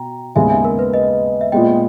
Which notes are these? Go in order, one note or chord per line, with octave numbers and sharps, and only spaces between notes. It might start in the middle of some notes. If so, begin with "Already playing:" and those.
Already playing: B2 G5 A#5
D#2 C#3 G#3 B3 E5 G#5
E5 G#5
A#4
B4
B4 D#5
E5
A#2 G#3 B3 D#5 G5